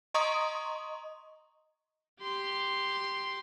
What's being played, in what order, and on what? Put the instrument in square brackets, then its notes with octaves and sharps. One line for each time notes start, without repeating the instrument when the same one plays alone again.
[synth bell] D#5 A#5 C6 C#6 D#6
[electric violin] G4 C6